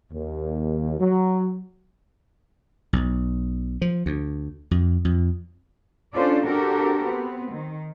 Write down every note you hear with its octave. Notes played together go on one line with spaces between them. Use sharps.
D#2
F#3
B1
F3
D2
F2
F2
C#4 D4 F4 A4 C5 D5
C4 D4 F#4 G4 A4 A#4
B3 C4
D#3